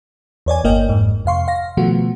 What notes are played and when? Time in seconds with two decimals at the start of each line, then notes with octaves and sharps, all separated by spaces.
0.46 E2 C#5 D5 G#5
0.64 G1 A#3 D#5 G5
0.89 F2 G#2
1.25 F2 C3 F5 C6 C#6
1.48 F5 A#6
1.77 B2 D#3 F3 A3 B3 F#4